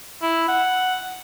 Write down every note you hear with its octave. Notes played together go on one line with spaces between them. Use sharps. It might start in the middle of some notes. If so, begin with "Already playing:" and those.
E4
F#5